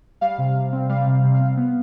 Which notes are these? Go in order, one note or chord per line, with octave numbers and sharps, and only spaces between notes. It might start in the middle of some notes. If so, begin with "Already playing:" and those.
G3 F5
C3
C3
C4
G3 F5
C3
C3
F5
C4
B3